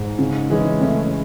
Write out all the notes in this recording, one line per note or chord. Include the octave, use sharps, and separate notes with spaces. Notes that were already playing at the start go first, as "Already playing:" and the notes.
Already playing: G#2
C#3
E3 G#3 C#4
A2 C#3
A2